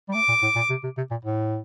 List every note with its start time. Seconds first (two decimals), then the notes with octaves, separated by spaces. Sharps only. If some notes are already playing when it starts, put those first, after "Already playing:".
0.08 G3
0.14 A3 D6
0.28 A#2
0.42 A2
0.56 A#2
0.70 C3
0.83 C3
0.97 C3
1.11 A#2
1.25 A2